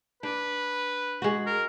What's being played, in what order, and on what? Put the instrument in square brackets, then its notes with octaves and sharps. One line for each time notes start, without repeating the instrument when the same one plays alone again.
[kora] D4 [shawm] B4
[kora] G#3 F#4
[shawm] A#4